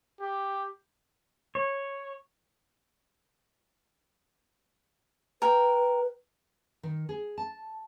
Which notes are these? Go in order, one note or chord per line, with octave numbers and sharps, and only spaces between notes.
G4
C#5
A#4 B4 G5
D#3
G#4
A5